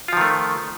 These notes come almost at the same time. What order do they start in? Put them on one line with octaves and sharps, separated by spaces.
F4 F3 D#3 A3